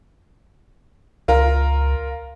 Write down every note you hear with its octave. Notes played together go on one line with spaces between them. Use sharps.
C#2 F4 A#4